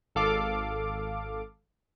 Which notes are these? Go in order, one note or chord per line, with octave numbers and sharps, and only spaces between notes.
G#1 A4 F5 D6